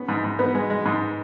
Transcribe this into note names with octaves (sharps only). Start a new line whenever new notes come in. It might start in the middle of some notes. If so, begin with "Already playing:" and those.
Already playing: B3 C#4
G#2
G#2
B3
G#3
G#3
G#2